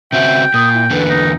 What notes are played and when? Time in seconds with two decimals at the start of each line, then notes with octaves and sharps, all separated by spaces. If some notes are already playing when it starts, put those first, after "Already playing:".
0.12 C#3 C4 F#4 E5 G5
0.54 A#2 D#6
0.74 E4
0.90 E2 D3 A#3 B4
1.10 D#4